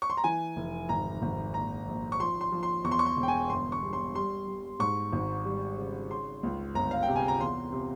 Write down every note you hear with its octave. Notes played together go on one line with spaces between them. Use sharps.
C#6
C6
A#5
E3 G#5
F1
G#1 A#5
G#1
A#1 A#5
A#1
C#6
F3 C6
C6
F3
C6
E2 C#6
C6
C#6
C6
E1
G5
G#5
G1 C6
C#6
G3
C6
G3 C6
G3
G#2 C#6
G#1
G3
C#3
C#3 C6
C#2
G1 A#5
F5
G5
C3
G#5
A#5
E2 C6
C3